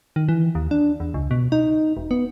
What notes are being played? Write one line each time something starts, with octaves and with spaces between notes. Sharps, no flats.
D#3
E3
D#2
D4
E2
C#2
B2
D#4
E1
B3